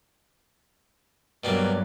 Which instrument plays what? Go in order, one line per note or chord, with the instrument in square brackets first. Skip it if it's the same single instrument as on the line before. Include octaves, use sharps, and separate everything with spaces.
[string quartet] G2 F#3 [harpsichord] B2 G3 A#3